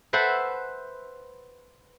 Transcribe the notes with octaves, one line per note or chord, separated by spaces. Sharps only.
B4 C5 E5 F#5 A5 B5